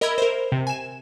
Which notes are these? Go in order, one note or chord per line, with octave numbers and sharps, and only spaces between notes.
A#4 D#5 E5 B5 E6 G#6
A#4 C5
C3
G#5 E7